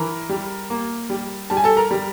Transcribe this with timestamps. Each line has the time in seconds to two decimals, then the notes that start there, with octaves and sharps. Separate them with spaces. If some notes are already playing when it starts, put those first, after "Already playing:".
Already playing: E3 A#4 A#5
0.29 G3
0.70 A#3
1.10 G3
1.50 G3 A5
1.57 G#5
1.64 A4 A5
1.77 A#4 A#5
1.91 G3